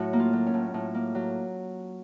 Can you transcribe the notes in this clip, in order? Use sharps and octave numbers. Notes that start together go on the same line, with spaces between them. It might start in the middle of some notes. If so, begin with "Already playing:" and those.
Already playing: A2 F#3 F#4
A#3
F4
F#3
C#4
A2
A2
A#3
F#3